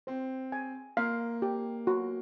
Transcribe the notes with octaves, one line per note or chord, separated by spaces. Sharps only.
C4 C5
G#5
A#3 F5
G4
F#4